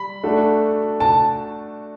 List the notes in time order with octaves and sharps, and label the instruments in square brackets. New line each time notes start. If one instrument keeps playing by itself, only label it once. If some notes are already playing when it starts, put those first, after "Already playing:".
Already playing: [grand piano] G3 [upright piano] B5
[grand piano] A3 D4 F#4 A4
[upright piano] A5